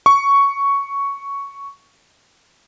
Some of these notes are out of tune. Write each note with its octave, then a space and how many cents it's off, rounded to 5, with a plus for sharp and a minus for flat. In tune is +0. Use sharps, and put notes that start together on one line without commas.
C#6 +5